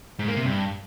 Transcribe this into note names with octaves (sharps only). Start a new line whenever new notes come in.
G#2
A#3
C3
G2